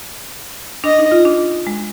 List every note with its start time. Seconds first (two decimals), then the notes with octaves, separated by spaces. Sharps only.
0.84 D4 D#5
0.99 D#4
1.12 F4
1.25 D4
1.67 G#3